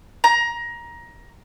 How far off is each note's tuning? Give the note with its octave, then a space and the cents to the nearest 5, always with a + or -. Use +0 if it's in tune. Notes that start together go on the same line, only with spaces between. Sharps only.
A#5 +20